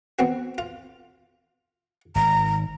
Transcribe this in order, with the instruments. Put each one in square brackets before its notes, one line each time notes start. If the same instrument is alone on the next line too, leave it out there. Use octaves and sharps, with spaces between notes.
[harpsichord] B3 C4 F#4
F4
[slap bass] G#1 [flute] A#5